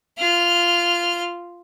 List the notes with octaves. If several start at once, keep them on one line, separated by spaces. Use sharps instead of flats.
F4 F6